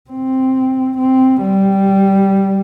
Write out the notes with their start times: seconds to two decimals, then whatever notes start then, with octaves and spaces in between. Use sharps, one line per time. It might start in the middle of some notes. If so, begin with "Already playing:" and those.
0.10 C4
0.98 C4
1.41 G3